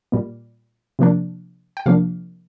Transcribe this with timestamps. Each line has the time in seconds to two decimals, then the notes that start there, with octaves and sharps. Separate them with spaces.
0.12 A#2 G3 A#3
0.99 C3 F3 A#3 D4
1.77 G5
1.86 C3 F3 A#3 D4 F5